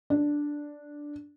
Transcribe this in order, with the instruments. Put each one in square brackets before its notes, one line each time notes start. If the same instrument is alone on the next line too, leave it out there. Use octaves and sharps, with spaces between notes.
[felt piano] D4